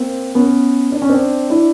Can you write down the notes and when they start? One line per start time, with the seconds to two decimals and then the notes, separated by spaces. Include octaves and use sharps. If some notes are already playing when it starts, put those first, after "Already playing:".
Already playing: A#3 C4
0.35 B3 C#4
0.92 D4
1.02 C#4
1.10 C4 D4
1.50 D4 E4